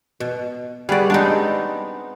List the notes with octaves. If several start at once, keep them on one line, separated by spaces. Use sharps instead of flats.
B2
G3 B3 F#4 G#4 D5
G#3 B3 C4 D4 D#4